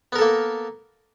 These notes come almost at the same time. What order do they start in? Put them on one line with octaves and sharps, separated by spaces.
B3 A#4 A4 A#3